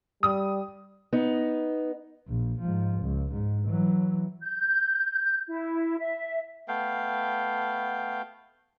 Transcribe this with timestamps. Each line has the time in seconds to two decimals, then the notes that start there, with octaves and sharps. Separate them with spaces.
0.23 G3 D#6
1.13 B3 D#4
2.28 A#1
2.60 G#2 F3
3.01 C#2
3.33 G#2
3.65 E3 F#3
4.42 G6
5.48 E4
5.99 E5
6.68 A3 B3 F5 G5